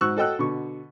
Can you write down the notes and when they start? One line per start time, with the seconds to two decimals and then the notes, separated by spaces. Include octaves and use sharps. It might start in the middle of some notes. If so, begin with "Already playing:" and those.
0.01 G#2 F#4 C#6 E6 F#6
0.17 F#4 A4 D#5 G5 E6 F#6
0.39 B2 D3 C#6